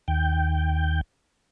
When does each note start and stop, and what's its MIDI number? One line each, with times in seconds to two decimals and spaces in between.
0.08 1.01 39
0.08 1.01 79